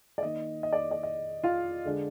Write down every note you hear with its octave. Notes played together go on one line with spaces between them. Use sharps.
D5
D#3 A#3 D#4 D#5
D#5
D5
D5
D#5
F4 F5
D3 G#3 D4